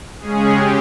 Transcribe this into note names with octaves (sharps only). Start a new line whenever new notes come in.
C#3 G#3 C#4 G#4
G4